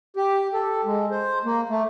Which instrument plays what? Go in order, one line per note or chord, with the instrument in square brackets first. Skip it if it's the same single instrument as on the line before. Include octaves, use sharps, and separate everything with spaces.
[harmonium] G4
A4
G#3
C5
A#3
A3